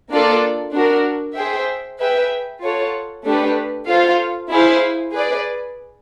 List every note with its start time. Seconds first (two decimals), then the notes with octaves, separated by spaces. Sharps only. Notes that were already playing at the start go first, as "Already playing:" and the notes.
0.10 A#3 D4 F4 A4 D5
0.73 D4 F#4 A#4
1.36 G#4 C5 E5 G5
1.99 G#4 B4 E5 G5
2.61 F4 A4 C#5 F#5
3.24 A3 D4 G4 B4
3.87 F4 A4 C5 F5
4.50 E4 G#4 C5 F5
5.12 G#4 B4 D5